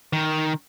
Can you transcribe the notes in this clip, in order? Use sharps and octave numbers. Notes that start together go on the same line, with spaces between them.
D#3